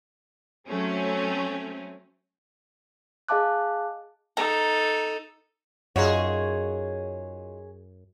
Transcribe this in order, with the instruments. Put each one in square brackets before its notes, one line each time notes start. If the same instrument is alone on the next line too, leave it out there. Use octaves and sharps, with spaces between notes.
[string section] F#3 A3 C4 C#4
[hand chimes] G#4 D#5 F5 A5 D6 F#6
[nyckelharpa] D#4 A4 [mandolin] A#5
[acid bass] F#2 [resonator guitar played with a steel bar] D#4 F4 F#4 [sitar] G#4 C#5